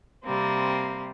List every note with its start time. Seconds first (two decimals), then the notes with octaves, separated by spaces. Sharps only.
0.25 C3 G3 A#3 C4